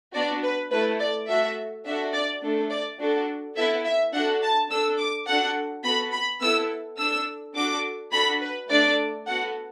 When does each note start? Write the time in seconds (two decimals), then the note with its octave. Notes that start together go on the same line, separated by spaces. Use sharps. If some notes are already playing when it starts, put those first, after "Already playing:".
0.13 B3 D4 F#4 D5
0.42 B4
0.71 A3 E4 A4 B4
1.00 D5
1.28 A3 F#4 A4 E5
1.85 D4 F#4 A4 E5
2.13 D5
2.42 A3 D4 A4
2.71 D5
2.99 D4 F#4 A4
3.56 B3 E4 A4 E5
3.85 E5
4.13 D4 F#4 A4 F#5
4.42 A5
4.70 D4 A4 E6
4.99 D6
5.27 D4 F#4 A4 F#5
5.83 B3 F#4 A4 B5
6.12 B5
6.41 B3 E4 A4 E6
6.98 D4 A4 E6
7.55 D4 F#4 A4 D6
8.12 D4 F#4 A4 B5
8.41 B4
8.69 A3 D4 A4 D5
9.26 B3 F#4 A4 F#5